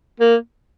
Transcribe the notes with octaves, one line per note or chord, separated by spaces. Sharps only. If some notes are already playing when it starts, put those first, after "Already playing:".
A#3